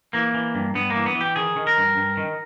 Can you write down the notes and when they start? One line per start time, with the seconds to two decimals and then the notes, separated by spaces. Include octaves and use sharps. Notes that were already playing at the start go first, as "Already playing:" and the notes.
0.13 E3 A#3
0.34 E3
0.55 G2
0.75 G2 B3
0.90 A#3
0.95 E3
1.06 B3
1.15 E3
1.21 G4
1.36 D#3 G#4
1.56 D#3
1.67 A#4
1.77 G2
1.97 G2
2.17 D#3